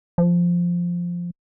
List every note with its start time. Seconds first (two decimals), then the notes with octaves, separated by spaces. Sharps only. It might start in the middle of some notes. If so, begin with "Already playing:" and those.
0.18 F3